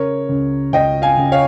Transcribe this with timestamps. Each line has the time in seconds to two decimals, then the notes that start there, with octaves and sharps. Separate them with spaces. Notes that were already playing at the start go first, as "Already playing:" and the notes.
Already playing: C#3 A#4 C#5
0.29 C#2
0.73 C#2 D#5 G5
1.02 F5 G#5
1.17 C#2
1.32 C#5 F5